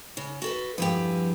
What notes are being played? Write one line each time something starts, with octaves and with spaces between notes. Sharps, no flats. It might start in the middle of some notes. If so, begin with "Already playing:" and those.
C#3
F#4 A4 B4
E2 G2 F3 G4 G#4 B4